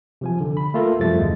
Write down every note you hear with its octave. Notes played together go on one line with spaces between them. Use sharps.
C3 F3 G#5
D3
B5
A3 A#3 F4 A4 A#4
F#2 C3 F3 G3 A3 A6
D#2 A2 G#3